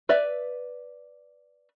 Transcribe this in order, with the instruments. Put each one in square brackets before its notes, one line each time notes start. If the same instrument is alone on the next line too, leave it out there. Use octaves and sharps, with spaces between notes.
[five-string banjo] B4 D5 E5